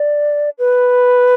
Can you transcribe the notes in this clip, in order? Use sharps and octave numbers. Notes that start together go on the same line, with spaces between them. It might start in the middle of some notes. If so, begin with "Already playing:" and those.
Already playing: D5
B4